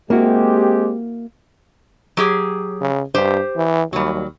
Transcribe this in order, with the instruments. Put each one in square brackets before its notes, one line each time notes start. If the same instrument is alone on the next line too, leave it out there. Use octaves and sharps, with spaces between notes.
[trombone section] G#3 C4 G4 [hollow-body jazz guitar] A#3 E4 F#4
[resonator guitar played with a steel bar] F#3 G4 G#4
[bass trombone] C#3
[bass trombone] G2 [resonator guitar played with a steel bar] G4 C5
[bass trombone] E3
[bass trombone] D#2 [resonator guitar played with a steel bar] F#3 G3